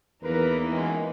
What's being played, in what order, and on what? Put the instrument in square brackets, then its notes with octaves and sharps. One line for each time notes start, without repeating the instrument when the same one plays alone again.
[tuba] E2 [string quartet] E3 A#3 D#4 [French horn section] A#4 B4
[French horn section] F#2 D#3 G#3